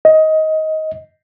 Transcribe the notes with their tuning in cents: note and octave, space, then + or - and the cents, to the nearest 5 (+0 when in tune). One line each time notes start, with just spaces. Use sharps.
D#5 +15